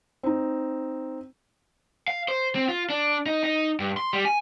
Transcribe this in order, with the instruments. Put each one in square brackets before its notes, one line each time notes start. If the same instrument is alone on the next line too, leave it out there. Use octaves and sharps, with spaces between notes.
[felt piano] C4 D#4
[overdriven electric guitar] F5
C5
C4
F4
D4
D#4
D#4
G2
C6
G3
G#5